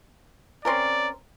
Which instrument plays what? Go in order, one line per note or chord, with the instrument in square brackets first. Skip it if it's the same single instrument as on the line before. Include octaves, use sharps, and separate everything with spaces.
[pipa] C4 C#4 A#4 [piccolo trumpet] D5